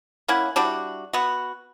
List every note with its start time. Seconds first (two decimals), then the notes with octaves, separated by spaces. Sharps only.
0.28 A#3 C#4 E4 F#5
0.56 G3 D4 E4 F#4
1.13 B3 F#4